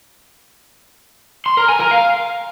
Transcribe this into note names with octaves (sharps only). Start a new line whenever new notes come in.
C6
A#4
G#5
A#4
F5